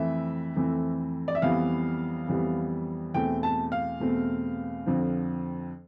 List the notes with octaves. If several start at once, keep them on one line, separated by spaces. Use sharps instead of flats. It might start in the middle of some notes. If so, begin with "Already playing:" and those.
Already playing: F2 E3 A3 C4 E5
F2 E3 A3 C4
D5
E5
F2 E3 G3 B3 F5
F2 E3 G3 B3
E2 B2 A3 C4 G5
A5
F5
E2 B2 A3 C4
F2 D3 F3 C4